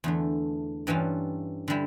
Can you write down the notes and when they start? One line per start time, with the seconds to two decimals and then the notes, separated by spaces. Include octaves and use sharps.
0.04 E2 D3 A3
0.87 G2 E3 G3 C#4 F4
1.68 D3 G3 E4